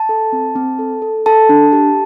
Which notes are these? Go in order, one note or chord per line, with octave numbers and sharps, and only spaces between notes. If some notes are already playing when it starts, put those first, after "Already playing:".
Already playing: A5
A4
C4
C4
A4
A4
A4 A5
D4
G4